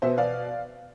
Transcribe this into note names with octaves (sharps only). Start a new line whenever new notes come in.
B2 B3 C5 E5
D5 F5